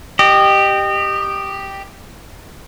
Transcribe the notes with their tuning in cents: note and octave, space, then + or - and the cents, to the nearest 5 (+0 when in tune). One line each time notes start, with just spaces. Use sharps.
G4 +0 D#5 -25